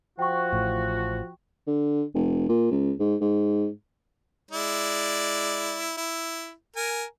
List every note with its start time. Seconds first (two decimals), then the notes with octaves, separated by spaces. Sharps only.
0.19 F3 F#4 G5 C#6
0.53 A1 A2
1.67 D3
2.14 F1
2.49 A#2
2.71 C#2
2.99 G#2
3.21 G#2
4.51 G#3 E4 D5
5.97 E4
6.76 A#4 G#5